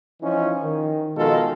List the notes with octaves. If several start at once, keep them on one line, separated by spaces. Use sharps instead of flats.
E3 F3 C#4 D#4
D#3
B2 D#3 F3 G#3 F4 A4